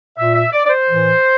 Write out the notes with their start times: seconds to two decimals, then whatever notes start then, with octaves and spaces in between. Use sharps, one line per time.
0.18 A#2 E5
0.35 E5
0.52 D5
0.66 D5
0.70 C5
0.87 A2 E3